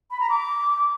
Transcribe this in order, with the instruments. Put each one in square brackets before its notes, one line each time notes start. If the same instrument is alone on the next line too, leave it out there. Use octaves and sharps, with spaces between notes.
[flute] B5
A#5
D6